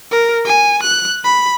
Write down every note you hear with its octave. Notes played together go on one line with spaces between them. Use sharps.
A#4
G#5
F#6
B5